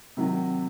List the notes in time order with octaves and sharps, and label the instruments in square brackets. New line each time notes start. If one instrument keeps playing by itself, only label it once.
[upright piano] C3 D#3 F#3